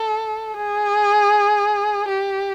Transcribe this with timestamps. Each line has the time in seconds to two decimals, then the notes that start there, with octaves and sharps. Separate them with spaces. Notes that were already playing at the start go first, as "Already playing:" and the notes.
Already playing: A4
0.57 G#4
2.08 G4